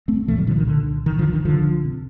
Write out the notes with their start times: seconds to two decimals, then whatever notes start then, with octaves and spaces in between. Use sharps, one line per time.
0.08 A3 C4
0.27 C2 A#2 F3 A3
0.37 D#3 G3
0.47 D3 F3
0.58 D#3
0.67 D3
1.06 D#3
1.19 D3 F3
1.33 D#3
1.45 D3 F3
1.85 C3